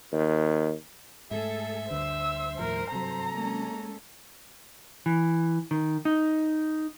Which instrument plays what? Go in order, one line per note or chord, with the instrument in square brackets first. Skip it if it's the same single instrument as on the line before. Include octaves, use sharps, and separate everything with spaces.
[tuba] D#2
[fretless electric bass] G#2 A3 [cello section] G#4 A4 [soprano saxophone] E5
[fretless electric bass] D2 D3 [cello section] G2 C5 [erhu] E6
[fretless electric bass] D#2 A2 F3 [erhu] A#4
[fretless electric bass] C3 F#3 [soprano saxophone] A4 [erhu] A#5
[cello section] G#3 A#3 C#4
[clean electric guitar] E3
D#3
D#4